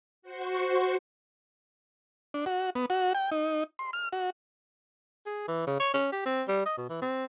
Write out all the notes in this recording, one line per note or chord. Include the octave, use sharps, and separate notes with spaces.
F#4 C5 C#6
D4
F#4
B3
F#4
G5
D#4
C6
F6
F#4
G#4
E3
C#3
C#5
C#4
G4
C4
G3
D#5
B2
E3
C4